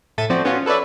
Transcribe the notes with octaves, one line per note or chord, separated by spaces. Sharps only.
A2 A4 E5 A6 D#7
F3 C4 F#4 C5 D5
B3 C#4 F4 F#4
A4 B4 C#5 D5 E5